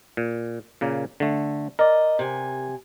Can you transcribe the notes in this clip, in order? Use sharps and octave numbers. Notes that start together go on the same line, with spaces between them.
A#2
A#2 C#3 A#3
D3 A3
A#4 D5 D#5
C3 G#5